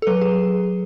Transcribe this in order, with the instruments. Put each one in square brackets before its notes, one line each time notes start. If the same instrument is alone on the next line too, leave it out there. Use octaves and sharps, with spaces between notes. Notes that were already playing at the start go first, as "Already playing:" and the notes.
[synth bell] A4
F#3 B4
G#4